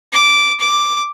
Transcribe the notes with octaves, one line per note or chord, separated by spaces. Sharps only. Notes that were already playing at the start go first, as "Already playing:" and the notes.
D6
D6